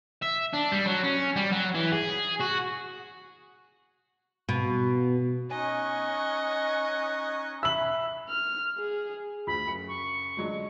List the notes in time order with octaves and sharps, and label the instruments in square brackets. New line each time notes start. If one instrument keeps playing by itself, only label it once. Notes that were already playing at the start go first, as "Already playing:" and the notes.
[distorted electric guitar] E5
D4
G3
F#3
C#4
G3
F#3
E3
G#4
F#4
[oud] B2
[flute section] C#4 D#4 F#6 [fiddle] D#5 C#6 [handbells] G#5
[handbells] E5 B5 [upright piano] E6 F#7
[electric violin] F6
G#4
[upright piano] D2 [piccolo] B5
[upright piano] F#1 C#7
[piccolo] C#6
[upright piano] D3 F#3 G#3